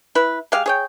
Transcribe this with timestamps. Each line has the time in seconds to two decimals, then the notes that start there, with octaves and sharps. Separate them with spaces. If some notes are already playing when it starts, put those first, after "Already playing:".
0.15 E4 B4
0.52 G#3 G4 F5
0.66 G#4 C#5 G5